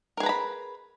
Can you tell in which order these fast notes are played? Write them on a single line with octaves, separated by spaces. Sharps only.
A#4 G#4 B4 A#5 B5